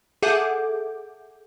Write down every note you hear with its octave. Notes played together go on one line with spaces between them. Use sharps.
G#4 A4 E5 F#5 D6 G6